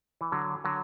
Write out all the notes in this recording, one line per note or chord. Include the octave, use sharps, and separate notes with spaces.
E3
D3 F#3
D3 F#3